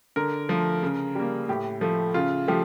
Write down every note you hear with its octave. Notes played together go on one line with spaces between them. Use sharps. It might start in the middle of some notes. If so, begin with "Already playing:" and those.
D3 A#4
F3 A3
C#3
G3 A#3
A2 G4
F3 A3
C#3 F4
F3 A3 G4